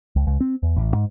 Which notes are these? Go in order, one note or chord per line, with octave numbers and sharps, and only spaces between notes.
C#2
C#2
C4
E2
A1
G#2